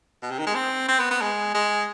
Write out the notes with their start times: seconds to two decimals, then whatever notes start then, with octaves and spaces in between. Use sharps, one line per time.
0.22 B2
0.31 C3
0.39 D#3
0.47 G#3
0.55 C4
0.88 C4
0.99 B3
1.11 B3
1.21 G#3
1.54 G#3